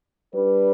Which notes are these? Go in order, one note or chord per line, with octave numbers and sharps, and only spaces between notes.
G3 D4 B4